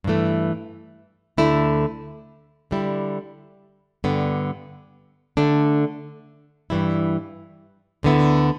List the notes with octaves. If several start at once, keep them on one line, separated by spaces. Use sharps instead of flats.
G2 E3 A3
D2 D3 A3 E4
D3 G3 E4
G2 D3 B3
D3 A3 D4
G2 E3 G3 E4
D2 D3 B3 E4